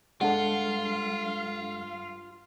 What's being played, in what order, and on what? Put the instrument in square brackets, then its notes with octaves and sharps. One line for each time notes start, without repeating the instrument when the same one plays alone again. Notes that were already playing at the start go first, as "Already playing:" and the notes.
[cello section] G2 F5 [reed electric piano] G#3 D4 A4 [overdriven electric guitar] F4 [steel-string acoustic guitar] F#5